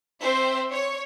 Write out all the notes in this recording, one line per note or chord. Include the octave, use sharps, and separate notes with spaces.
C4 C5 E5
C#5